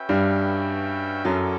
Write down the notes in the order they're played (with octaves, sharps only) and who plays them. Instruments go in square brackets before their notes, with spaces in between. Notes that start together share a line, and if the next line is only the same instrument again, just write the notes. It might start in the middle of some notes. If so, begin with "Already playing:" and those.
Already playing: [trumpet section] C#4 F#4 B4 E5 G5
[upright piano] G2 G3
[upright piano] F#2 F#3 [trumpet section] C#4 E4 A4 D5